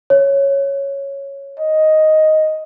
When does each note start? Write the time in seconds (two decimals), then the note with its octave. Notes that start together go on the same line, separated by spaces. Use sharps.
0.10 C#5
1.59 D#5